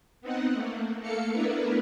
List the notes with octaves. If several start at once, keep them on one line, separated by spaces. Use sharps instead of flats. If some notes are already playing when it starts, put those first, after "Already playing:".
B3 C4 D#4 F#5
A3 A#3
A3 A#3 A4 F5 C#7
A3 B3 D4 E4 A#4 B4